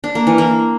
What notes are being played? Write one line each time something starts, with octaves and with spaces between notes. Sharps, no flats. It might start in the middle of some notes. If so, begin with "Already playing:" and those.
D4
A#3
E3
A#3